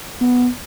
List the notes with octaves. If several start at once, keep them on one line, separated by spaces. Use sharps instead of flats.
B3